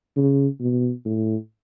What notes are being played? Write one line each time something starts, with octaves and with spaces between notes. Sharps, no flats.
C#3
B2
A2